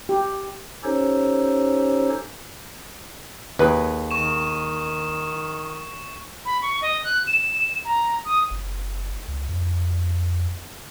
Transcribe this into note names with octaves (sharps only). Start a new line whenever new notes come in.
G4
C#4 D#4 G4 A4 C5 C#5
D#2 G#4 B4
D#3 C#6 E7
B5
C#6
D#5
F#6
E7
A#5
D#6
F#1
C#2
F2